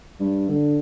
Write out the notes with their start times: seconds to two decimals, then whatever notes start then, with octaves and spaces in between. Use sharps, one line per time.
0.20 G2
0.48 D3